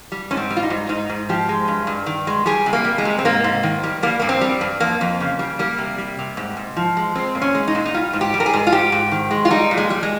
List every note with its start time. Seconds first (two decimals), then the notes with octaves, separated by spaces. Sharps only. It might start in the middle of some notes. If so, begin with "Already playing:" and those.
0.12 G3
0.31 G#2 C#4
0.37 C4
0.50 G3
0.56 F4
0.63 D#4
0.70 G#2
0.89 G#2 D#4
1.09 G#2
1.29 F3 G4
1.49 G#3
1.68 G2
1.87 G2
2.06 D#3
2.27 G#3
2.46 G3 G#4
2.66 C3
2.73 A#3
2.85 G3
2.98 G#3
3.05 C3
3.19 C4
3.25 G#2 A#3
3.44 G#2
3.63 D#3
3.83 G3
4.03 G3 A#3
4.20 G2 A#3
4.29 C4
4.41 G3
4.61 G2
4.80 F2 A#3
5.01 F2
5.20 C#3
5.39 G3
5.59 G3 A#3
5.78 C3
5.98 G3
6.19 C3
6.37 G#2
6.57 G#2
6.77 F3
6.97 G#3
7.15 G#3 C4
7.35 A#2
7.42 C#4
7.55 G#3
7.68 D#4
7.75 A#2
7.86 D#4
7.94 G3 F4
8.13 G#2
8.21 G4
8.34 G3
8.40 A#4
8.46 G#4
8.54 G#2
8.67 F4
8.72 G#2 G4
8.92 G#2
9.11 D#3
9.31 G#3
9.45 F4
9.51 G3 D#4
9.71 A#2
9.77 G#3
9.90 G3
10.03 G#3